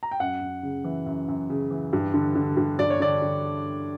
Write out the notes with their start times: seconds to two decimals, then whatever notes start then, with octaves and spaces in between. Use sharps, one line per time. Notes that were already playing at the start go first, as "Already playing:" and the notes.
0.03 A#5
0.11 G5
0.20 F#2 F#5
0.41 F#2
0.63 C#3
0.84 E3
1.06 F#2
1.28 F#2
1.50 C#3
1.70 E3
1.93 G2
2.14 D3
2.36 D3
2.57 G2
2.79 G2 D5
2.90 C#5
3.00 D3 D5
3.22 D3